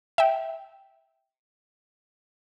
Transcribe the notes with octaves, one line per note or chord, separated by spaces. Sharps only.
E5 G5